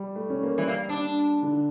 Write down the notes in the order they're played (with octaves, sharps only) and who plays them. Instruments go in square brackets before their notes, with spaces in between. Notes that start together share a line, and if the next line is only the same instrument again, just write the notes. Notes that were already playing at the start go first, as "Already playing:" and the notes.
Already playing: [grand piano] G3
A3
C#4
A#3
[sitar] E3 [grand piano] G3
[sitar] A#3
D4
[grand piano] D3